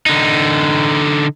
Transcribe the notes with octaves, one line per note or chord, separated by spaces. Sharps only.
D3 D#4